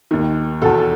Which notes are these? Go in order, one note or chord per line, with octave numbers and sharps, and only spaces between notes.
D#2 D#3
E2 B2 A4